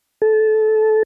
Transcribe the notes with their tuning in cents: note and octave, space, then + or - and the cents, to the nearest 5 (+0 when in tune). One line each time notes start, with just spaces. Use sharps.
A4 -20